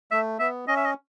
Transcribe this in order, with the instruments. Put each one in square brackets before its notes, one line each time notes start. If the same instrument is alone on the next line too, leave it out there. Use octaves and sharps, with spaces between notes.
[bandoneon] A3 [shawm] E5
[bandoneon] B3 [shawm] E5
[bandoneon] C#4 [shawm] D#5
[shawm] E5
D#5